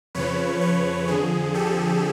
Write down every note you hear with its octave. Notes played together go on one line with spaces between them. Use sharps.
F2 C#3 F3 B4 C#5
B4 C#5
F2 D3 F3 G#4
G4 A4